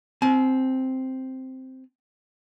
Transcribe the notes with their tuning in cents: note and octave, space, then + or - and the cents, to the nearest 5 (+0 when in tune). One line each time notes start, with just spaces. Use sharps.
C4 +0 G#5 +45